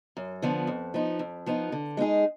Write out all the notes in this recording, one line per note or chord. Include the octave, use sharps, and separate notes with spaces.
F#2
D3 F3 B3
F2
F3 B3 D#4
F2
F3 B3 D#4
D3
G#3 B3 D#4 G#4